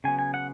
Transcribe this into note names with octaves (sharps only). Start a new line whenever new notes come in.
C#3 F#3 B3 G#5
G#5
F#5